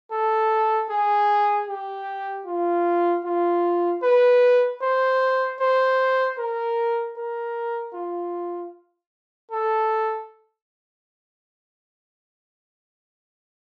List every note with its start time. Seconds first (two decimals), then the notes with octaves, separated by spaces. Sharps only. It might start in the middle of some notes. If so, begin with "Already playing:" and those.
0.11 A4
0.89 G#4
1.69 G4
2.46 F4
3.25 F4
4.03 B4
4.81 C5
5.60 C5
6.38 A#4
7.16 A#4
7.94 F4
9.51 A4